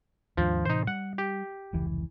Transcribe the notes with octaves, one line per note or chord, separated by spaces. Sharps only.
D#2 G#2 F3 D4
A2 C3 E3 D#4 C5
G3 F#5
G4
F1 C#2 E3